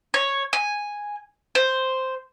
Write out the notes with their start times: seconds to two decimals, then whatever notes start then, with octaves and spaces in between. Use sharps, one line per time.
0.14 C#5
0.53 G#5
1.55 C5